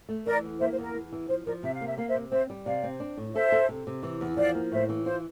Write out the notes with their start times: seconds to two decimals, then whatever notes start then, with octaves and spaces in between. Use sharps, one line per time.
0.09 A3
0.26 E3 A#4 D5
0.44 E2
0.60 A#3 C5 E5
0.72 C5
0.78 E2 A#4
0.95 E2
1.12 E3
1.29 F3 C5
1.46 F3 A#4 D5
1.63 C3 E5
1.74 F5
1.81 A#3
1.86 E5
1.97 A#3 F5
2.09 C5 E5
2.15 C3
2.32 C4 C5 E5
2.50 G3
2.66 C3 D5 F5
2.83 C4
3.00 D4
3.17 A2
3.34 A4 C5 E5
3.52 A4
3.69 C3
3.87 C3
4.03 E3
4.21 E2
4.37 F3 D5 F5
4.55 A#3
4.71 A2 C5 E5
4.89 E3
5.06 F4 C5